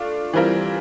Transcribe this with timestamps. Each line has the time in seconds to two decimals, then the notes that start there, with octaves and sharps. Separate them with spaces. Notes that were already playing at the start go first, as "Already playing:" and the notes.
Already playing: A3 D4 F4
0.34 E3 G3 C4 F4 A#4